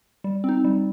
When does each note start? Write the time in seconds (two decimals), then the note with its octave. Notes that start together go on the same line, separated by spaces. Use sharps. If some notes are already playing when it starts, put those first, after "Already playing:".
0.24 G3
0.44 C4 D#4
0.64 G3